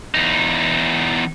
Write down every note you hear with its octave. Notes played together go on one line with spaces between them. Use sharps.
E2 D#4